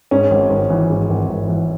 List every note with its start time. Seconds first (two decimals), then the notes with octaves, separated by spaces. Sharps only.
0.11 G#2 C#4
0.31 G#1
0.50 G#1
0.70 E3
0.90 G#2
1.10 G#1
1.29 G#1
1.48 E3